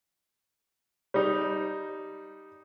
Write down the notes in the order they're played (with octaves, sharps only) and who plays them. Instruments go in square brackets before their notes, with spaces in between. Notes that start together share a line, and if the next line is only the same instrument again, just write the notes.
[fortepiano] G3 D#4